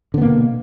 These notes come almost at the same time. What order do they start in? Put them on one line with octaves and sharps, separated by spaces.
D3 B3 A#3 B2